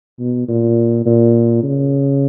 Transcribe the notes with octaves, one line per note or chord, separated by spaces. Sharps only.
B2
A#2
A#2
C#3